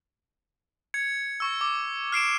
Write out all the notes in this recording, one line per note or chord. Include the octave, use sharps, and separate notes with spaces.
G#6 C#7
C#6 E6
D6
F6 C7 D7 E7